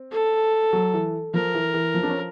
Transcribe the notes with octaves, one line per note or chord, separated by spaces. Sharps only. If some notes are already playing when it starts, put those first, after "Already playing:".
Already playing: C4
A4
F#3
E3
F3 A#4
E3
E3
F3
D4
C#4